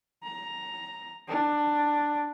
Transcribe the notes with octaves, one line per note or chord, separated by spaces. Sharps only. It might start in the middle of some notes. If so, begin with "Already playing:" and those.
A#5
D4